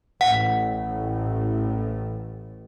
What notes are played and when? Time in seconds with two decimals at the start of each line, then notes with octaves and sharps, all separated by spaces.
0.21 A1 A2 F#5